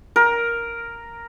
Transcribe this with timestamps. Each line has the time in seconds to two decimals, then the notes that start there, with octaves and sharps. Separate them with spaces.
0.16 A#4